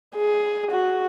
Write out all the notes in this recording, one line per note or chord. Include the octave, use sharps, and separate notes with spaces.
G#4
F#4